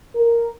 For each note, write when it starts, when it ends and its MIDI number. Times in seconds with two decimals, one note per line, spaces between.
0.14 0.49 70